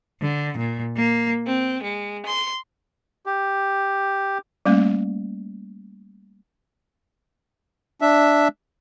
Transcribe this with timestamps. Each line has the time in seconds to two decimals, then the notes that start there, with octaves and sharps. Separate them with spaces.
0.22 D3
0.57 A#2
0.97 A#3
1.47 C4
1.83 G#3
2.26 C6
3.26 G4
4.66 G3 A3 A#3 C#4
8.01 D4 E5